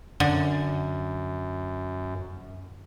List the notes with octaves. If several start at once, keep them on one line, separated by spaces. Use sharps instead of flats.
F#2 D3